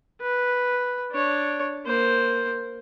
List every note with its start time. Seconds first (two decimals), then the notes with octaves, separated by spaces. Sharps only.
0.21 B4
1.12 D4 C#5
1.86 A#3 C5